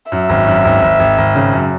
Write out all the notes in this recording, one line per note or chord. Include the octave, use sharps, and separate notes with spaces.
F#2 E5
G#1
F#2
G#1
G#1
G#1
G#1
C#3
F#2